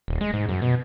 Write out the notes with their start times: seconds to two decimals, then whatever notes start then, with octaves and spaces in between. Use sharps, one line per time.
0.08 D#1
0.21 G#3
0.34 G#2
0.49 F#2
0.62 B2